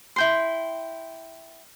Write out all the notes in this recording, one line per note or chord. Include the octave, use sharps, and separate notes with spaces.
E4 G5 C6